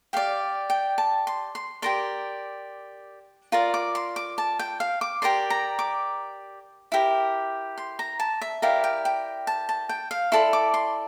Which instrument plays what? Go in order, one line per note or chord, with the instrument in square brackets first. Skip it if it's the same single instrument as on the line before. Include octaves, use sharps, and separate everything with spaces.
[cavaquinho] G4 D5 F5
G5
A5
C6
C6
G4 A#4 D5 C6
F4 A#4 D5
D6
C6
D6
A5
G5
F5
D6
G4 A#4 D5 C6
A#5
D6
E4 G4 A#4
C6
A#5
A5
E5
E4 G4 A#4 D5 F5
G5
G5
A5
A5
G5
F5
E4 A4 D5 C6
D6
C6